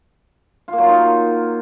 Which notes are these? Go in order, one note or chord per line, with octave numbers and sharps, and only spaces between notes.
F4
A#3
F#3
F4
D#4